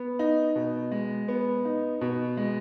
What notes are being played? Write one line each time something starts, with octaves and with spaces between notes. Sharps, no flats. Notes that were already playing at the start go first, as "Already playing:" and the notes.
Already playing: B3
D#4
B2
G#3
B3
D#4
B2
G#3